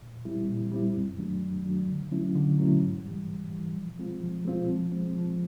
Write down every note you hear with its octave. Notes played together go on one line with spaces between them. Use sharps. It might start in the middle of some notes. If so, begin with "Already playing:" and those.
A#2
G3 C4 E4
A#2
G3 C4 E4
F#2
D#3 F#3 A3 D4
F#2
D#3 F#3 A3 D4
D3
F#3 A3 C#4 E4
D3
F#3 A3 C#4 E4
G#2
E3 G3
G#2
E3 G3
F3
G#3 C4 F4
F3
G#3 C4 F4
F3
G#3 C4
F3